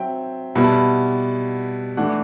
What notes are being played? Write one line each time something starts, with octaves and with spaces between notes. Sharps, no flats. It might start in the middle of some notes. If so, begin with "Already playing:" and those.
Already playing: F#3 C4 E5 G5
B2 G3 B3 E4 B5
A5
B5
E3 A3 D4 F#5